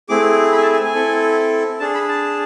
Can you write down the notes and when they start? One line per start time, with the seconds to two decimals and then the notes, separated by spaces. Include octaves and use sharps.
0.09 A3 C4 E4 G#4 D6
0.52 B5
0.57 G#5
0.62 A5
0.73 G#5
0.84 G#5
0.95 C4 E4 A4
1.80 D4 G#4 A5
1.94 B5
2.09 A5